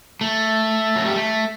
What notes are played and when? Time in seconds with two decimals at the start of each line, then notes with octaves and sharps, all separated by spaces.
0.21 A3
0.96 F#3
1.06 G3
1.16 A3